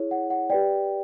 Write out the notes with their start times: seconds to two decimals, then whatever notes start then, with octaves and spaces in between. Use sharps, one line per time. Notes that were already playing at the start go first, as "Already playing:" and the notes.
Already playing: E4 G#4 C#5
0.11 F#5
0.30 F#5
0.50 G4 B4 D5 G5